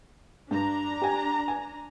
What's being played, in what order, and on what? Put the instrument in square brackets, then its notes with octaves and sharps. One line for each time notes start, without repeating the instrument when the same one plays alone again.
[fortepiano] G2 [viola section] D4 A#5
[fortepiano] G4 G#5
G#5